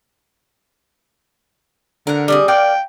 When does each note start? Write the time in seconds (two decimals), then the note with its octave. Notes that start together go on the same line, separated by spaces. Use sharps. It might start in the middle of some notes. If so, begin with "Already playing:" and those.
2.07 D3 A#4 F#5
2.28 G3 C4 G#4
2.48 A#3 D5 F5 G5